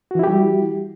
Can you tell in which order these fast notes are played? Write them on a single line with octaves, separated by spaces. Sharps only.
F#4 E3 E4 G4 G3